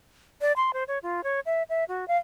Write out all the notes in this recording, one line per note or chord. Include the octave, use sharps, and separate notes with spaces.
D5
C6
C5
C#5
F4
C#5
E5
E5
F#4
F5